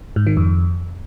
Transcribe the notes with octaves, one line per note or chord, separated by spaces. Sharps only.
G#2
D#3
F2